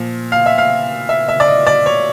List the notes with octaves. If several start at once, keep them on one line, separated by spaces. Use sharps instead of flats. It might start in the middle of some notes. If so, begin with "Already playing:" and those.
Already playing: A#2 F3
F5
E5
F5
E5
E5
D5
D#5
D5
C#5